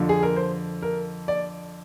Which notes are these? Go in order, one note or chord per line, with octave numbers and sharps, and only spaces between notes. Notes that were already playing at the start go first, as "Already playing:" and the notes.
Already playing: F2 D3 F3
G#4
A#4
C5
A#4
D5